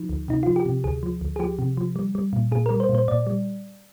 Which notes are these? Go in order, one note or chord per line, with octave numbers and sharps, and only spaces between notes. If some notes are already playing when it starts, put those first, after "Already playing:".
Already playing: F3 D#4
D2
C3 D#4
F3 F4
G4
C3
D2 G#4
F3
D2
G#4
F3 G4
C3
F3
G3
G3
A#2
A#2 G#4
G3 A#4
C5
A#2
C5
A#2 D5
G3